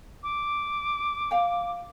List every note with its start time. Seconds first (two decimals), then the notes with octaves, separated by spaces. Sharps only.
0.23 D6
1.31 F5 G5